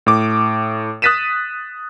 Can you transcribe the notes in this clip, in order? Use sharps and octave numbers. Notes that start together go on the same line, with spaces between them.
A2 D6
D#6 F#6 A6 B6 D#7 E7